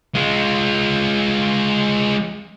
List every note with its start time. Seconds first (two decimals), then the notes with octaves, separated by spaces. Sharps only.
0.15 G#3 F4